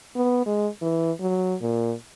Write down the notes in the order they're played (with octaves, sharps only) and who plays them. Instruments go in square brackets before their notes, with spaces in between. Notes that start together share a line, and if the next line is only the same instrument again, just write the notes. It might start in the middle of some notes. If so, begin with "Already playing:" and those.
[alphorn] B3
G#3
E3
F#3
A#2